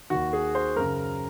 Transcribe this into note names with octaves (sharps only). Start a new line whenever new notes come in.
D#2 D#3 F#4
G#4
C5
F#2 C#3 A#4